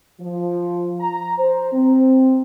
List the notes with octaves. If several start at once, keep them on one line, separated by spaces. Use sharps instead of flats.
F3
A#5
C5
C4